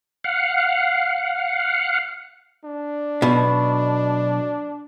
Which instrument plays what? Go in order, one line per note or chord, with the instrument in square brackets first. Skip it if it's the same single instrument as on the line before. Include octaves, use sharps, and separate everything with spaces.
[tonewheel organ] F5 F#5
[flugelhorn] D4
[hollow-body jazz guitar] B1 B2